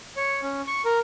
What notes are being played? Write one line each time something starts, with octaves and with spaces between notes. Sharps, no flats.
C#5
C#4
C#6
A#4